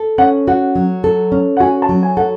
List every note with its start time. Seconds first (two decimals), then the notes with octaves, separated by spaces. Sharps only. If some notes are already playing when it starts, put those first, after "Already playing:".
Already playing: A4
0.18 C#4 F#5
0.48 F#4 F#5
0.75 F#3
1.04 A4
1.32 C#4
1.57 F#5
1.60 F#4 G#5
1.82 A5
1.89 F#3
2.03 G#5
2.17 A4 F#5